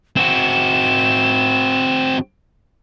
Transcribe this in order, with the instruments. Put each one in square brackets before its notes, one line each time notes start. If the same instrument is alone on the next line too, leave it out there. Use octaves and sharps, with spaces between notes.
[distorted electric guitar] C4 F#4 [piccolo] E7